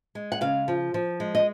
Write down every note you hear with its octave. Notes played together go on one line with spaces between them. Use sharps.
G#3
F#5
C#3 F5
F3
F3
G#3
D#5